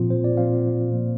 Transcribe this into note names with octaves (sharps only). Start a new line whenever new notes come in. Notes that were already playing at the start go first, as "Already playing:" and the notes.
Already playing: A#2 F3 C4 F4
C5
D5
A#2 F3 C4 C5 F5
A#2 A#3